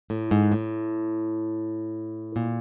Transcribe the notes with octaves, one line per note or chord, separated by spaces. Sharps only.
A2
G#2
A2
A#2